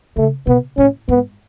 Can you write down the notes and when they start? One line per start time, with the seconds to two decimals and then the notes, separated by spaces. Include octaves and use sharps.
0.16 C#3 A3
0.47 B2 B3
0.77 A2 C#4
1.09 G#2 B3